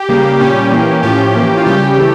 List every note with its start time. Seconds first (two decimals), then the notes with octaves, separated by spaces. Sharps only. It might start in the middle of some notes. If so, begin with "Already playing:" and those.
Already playing: G4
0.09 C#3 G3 A#3
0.40 A#2 G3 C#4 G4
0.71 E3 A#3 C#4
1.03 A2 F3 C#4 G4
1.35 E3 A#3 C#4
1.57 F4
1.66 C#3 G3 C#4 G4
1.97 E3 A3